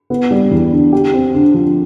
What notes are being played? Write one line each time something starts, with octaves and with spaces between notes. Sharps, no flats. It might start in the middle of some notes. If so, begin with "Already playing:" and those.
B3
G3
E2
D3
G4
C4
D3
F3